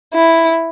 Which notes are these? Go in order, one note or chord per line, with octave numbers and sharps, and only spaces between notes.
E4